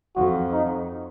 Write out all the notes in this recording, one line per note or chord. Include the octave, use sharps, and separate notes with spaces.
F2 F#4
D#4